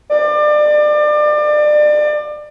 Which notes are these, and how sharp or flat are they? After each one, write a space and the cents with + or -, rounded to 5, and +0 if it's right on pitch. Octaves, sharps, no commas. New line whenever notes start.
D5 +30